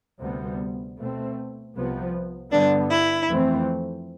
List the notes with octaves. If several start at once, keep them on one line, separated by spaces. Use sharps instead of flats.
D2 C3 G3 B3
B2 A3 C4
C2 C3 F3 B3
G2 D3 G3 B3 D4
E4
F2 E3 A3 C4